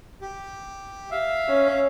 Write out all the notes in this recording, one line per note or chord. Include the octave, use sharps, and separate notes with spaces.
G4
E5 F5
C#4